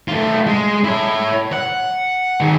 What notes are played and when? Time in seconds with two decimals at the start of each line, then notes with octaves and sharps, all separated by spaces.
0.08 A3 F4
0.47 G#3
0.84 E4 C#5
1.52 F#5
2.41 D#3 G#4